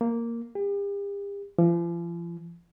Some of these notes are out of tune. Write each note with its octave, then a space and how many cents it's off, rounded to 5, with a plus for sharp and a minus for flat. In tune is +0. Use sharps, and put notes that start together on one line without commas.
A#3 -5
G4 +40
F3 -40